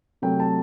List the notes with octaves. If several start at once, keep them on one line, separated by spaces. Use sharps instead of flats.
C3 F#3 A3 G5
A5